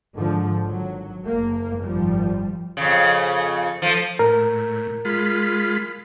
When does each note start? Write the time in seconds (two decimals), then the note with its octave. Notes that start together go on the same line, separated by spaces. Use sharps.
0.16 G#2 D3 F3
0.66 G#1 F#3
1.26 F#1 A#3
1.83 G#1 F3 G3
2.77 F2 C#3
3.82 F3 A3
4.19 A2 A#4
5.05 G#3 F4 B5